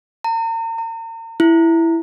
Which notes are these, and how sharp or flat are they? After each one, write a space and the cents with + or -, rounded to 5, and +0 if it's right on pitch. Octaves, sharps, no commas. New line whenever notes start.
A#5 -40
A#5 -40
E4 +5